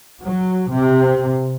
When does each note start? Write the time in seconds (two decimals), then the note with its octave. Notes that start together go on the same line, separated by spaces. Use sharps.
0.23 F#3
0.72 C3